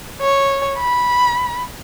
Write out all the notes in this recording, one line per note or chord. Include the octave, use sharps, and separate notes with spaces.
C#5
B5